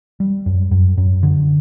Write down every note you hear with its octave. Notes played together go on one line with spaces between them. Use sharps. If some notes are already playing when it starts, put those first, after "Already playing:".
G3
F#2
F#2
F#2
D3